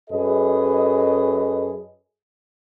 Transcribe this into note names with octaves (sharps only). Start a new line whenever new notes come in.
F#2 G#4 A4 B4 D#5